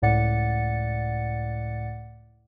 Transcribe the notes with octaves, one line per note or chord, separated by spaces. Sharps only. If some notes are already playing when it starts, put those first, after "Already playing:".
C#2 A2 D5 F#5 A6 C#7